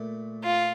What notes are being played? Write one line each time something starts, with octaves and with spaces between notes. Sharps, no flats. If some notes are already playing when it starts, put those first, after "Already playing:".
Already playing: A#2 A3
F4